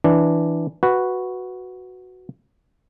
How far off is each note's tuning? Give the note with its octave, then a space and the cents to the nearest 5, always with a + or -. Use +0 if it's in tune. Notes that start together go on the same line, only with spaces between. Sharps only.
E3 +0 D4 +0
F#4 +0 B4 +0